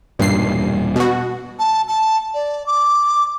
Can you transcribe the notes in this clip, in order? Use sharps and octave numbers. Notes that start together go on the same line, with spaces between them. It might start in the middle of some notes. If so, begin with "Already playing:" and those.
E1 G2 A#2 G3 C7
B2 F#4
A5
A5
D5
D6